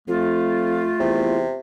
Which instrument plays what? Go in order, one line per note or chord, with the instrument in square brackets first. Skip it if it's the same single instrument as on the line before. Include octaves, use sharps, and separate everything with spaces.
[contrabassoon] F2 [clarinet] A3 [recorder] F4
[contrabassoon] E2 [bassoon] C3